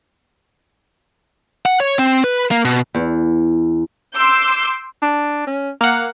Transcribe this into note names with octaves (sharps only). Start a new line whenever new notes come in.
F#5
C#5
C4
B4
A#3
B2
E2
C6 D6 E6 G6
D4
C#4
A#3 F5 F#5